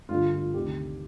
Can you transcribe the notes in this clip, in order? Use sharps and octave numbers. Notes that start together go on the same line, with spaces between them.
G2 D3 F4
F4
D2 C3 D#3 G4